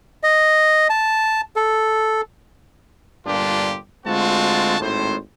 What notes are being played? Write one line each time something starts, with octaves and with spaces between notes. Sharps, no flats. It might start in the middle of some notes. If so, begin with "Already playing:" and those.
D#5
A5
A4
G1 G2 A#2 D4 F4 G4
D2 G#3 C4 F4 F#4 A5
G#1 A2 C5